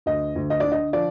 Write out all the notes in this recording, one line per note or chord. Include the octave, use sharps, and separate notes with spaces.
D2 D#5
D2
D#5
D3 D5
D#5
F3 D5